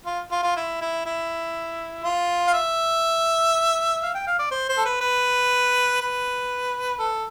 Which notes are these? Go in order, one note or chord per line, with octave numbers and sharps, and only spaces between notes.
F4
F4
F4
E4
E4
E4
F4
F5
E5
F5
G5
F5
D5
C5
C5
A4
B4
B4
B4
A4